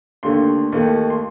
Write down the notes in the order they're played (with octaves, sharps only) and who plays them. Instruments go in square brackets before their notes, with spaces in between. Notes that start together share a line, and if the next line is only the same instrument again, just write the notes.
[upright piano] D#2 D3 A3 C6
D#2 D#3 A3
C6